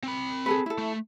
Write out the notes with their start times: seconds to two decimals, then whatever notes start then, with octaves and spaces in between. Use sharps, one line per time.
0.03 C4 B5
0.46 G#4 A4 B4
0.66 E4 A4
0.78 A3